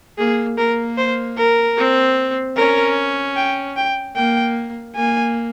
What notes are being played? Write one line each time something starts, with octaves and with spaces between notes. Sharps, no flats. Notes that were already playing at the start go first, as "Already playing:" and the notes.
A#3 G#4
A#3 A#4
C5
A#4
C4
C#4 A#4
G5
G5
A#3 G5
A#3 G#5